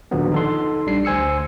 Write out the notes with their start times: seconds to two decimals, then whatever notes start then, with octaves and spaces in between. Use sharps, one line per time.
0.11 D#2 A#2 D3 F3 F#3 B3
0.32 D#4 A4 C6
0.86 A#1 G3 D4 C7
1.05 D2 C5 G#5 E6 C#7